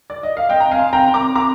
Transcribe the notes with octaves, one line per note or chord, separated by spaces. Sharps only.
D5
D#5
F5
C4 D#5 G5
A#5
F5 G#5
C4
G5 A#5
C4
A#5 D6
C4 A#5 D6